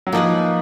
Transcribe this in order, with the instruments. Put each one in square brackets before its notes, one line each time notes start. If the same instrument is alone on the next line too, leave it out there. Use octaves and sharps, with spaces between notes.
[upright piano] F#3
[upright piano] F3 [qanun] A#3 D#4 G#4 B4